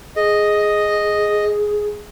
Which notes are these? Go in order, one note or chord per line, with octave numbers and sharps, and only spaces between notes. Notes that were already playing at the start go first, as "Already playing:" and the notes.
G#4 D#5